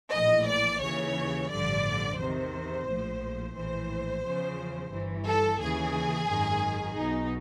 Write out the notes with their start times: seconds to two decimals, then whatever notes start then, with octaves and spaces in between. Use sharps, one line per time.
0.13 A#1 A2 E3 D#5
0.47 D5
0.82 D#2 C#3 E3 C#5
1.51 A1 G2 D3 F3 D5
2.18 E2 C3 D#3 C5
2.87 A#1 A2 F3
3.56 A#1 A2 E3 C5
4.24 E2 C#3 F3
4.92 G1 G2 E3
5.26 A4
5.60 D#2 C#3 E3 G#4
6.29 G#1 F#2 D#3
6.97 B1 B2 D#4